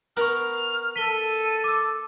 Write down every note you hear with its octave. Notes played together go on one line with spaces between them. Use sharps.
B3 A#4 A#5 C#6 F6
A4 B6 D#7 G7
D6 E6